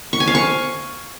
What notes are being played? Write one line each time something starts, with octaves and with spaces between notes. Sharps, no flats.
C#6
G#5
F5
C#6